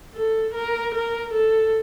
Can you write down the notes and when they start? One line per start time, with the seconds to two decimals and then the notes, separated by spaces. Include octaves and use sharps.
0.14 A4
0.54 A#4
0.95 A#4
1.34 A4